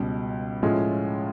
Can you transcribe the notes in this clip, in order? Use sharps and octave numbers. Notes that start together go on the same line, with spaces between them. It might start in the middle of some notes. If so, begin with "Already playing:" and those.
Already playing: C#2 B2 G3
A2 F3 G#3 C#4 F4